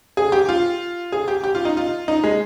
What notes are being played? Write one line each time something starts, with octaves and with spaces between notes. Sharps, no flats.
G#4
G4
F4
G#4
G4
G4
F4
D#4
F4
D#4
G#3